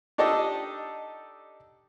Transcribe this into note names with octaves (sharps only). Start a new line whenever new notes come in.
D4 D#4 G4 A4 D5 D#5